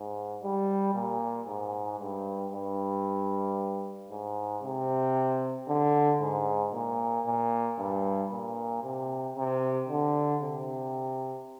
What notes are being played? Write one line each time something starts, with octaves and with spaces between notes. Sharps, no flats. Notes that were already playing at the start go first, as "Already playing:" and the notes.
Already playing: G#2
G3
A#2
G#2
G2
G2
G#2
C3
D3
G#2
A#2
A#2
G2
A#2
C3
C3
D3
C3